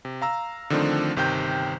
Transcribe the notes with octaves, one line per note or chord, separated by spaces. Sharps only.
C3
F5 A#5 E6
D3 D#3 F3 A3 C4 D4
G1 C3 D#3 C5 G5 G6